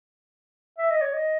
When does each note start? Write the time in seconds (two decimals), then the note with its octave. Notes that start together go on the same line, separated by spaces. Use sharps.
0.78 E5
0.90 D#5
1.01 C#5
1.14 D#5